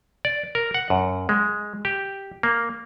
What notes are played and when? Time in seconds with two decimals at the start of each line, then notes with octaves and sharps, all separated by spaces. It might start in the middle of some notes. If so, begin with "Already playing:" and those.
0.25 D5
0.55 A#4
0.74 F#5
0.90 F#2
1.29 G#3
1.85 G4
2.43 A#3